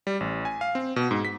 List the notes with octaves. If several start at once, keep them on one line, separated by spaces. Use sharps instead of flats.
G3
A1
G#5
F5
C4
B2
G#2
B6